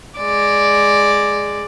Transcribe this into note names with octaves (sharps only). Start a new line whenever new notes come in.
G#3 D5